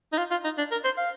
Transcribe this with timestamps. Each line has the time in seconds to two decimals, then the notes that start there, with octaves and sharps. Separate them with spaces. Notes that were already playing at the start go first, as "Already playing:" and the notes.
0.13 D#4
0.18 F4
0.31 F4
0.44 D#4
0.58 D4
0.71 A#4
0.84 C5
0.98 F5